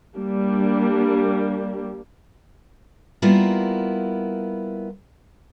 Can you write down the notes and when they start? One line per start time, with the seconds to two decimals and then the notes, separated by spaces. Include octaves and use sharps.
0.16 G3 A#3 D4
3.22 G3 A#3 B3 E4 F4 A#4